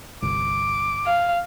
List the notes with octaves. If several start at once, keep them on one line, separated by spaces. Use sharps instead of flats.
G1 C2 D6
F5